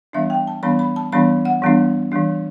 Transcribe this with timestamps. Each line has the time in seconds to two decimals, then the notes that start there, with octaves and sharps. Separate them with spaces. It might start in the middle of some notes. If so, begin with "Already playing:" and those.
0.13 E3 G3 B3 D4 E5
0.30 G5
0.47 A5
0.63 E3 G3 B3 D4 B5
0.79 B5
0.96 A5
1.12 E3 G3 B3 D4 B5
1.45 F#5
1.62 E3 G3 B3 D4
2.12 E3 G3 D4